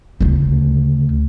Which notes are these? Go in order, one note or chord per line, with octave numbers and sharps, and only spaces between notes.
D2 C#3